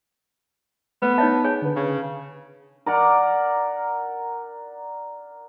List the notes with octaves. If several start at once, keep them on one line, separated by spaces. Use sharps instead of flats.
A3 B3 B4
D#4 C#5 E5 A5
G#4 C#5 G#5
D3 B4
C#3
A#4 D5 F#5 A#5